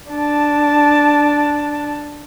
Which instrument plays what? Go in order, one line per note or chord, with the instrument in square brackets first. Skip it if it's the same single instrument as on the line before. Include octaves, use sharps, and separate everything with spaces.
[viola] D4 A5